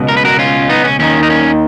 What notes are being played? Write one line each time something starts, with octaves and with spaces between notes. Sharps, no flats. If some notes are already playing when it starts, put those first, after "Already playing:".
Already playing: C#2 B2
A#4
B4
F#4 A#4
C#4 F4
B3 D#4
C#4
D#2 D#3 C#4
D#4
C#4